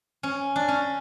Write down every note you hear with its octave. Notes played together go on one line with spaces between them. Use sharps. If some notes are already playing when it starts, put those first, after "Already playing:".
C#4
D4
C#4